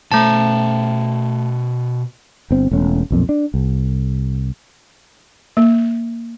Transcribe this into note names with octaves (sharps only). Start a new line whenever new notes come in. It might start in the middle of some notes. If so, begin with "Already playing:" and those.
B2 A3 C5 A5
G1 C4
E1 A3 C#4
B1 F2 A#2
D4
C2
A#3